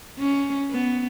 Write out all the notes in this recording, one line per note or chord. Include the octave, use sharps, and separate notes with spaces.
C#4
B3